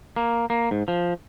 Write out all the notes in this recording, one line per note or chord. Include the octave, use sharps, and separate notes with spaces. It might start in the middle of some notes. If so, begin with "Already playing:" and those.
A#3
A#3
G#2
F3